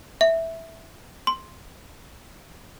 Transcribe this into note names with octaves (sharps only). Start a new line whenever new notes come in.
E5
C6